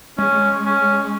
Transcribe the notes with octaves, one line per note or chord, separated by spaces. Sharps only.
G#3 C#4
C#4